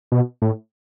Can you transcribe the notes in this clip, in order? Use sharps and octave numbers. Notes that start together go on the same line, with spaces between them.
B2
A2